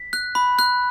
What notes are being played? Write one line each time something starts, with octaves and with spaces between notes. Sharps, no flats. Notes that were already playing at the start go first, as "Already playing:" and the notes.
Already playing: B6
F#6
B5
F#6